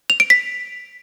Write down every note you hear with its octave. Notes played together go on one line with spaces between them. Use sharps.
F7
D7
B6